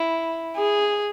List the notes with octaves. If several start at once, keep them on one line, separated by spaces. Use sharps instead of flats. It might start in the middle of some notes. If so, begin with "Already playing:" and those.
Already playing: E4
G#4